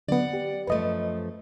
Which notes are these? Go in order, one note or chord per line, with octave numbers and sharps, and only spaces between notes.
D3 F#3 B3 D5 F#5
G4
F#2 F3 A3 B4 D#5